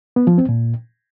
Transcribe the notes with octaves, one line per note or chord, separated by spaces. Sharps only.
B3
F3
C4
A#2